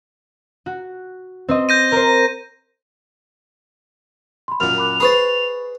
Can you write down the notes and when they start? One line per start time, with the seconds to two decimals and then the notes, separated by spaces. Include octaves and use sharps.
0.66 F#4
1.49 C4 C5 D#5
1.69 G6 A#6 D#7
1.92 A#4 C5
4.48 B5 C6
4.60 F#2 A#2 F6 F7
4.78 B5 D6 F#6
5.00 G#4 B4 C5 B5 C#6 A6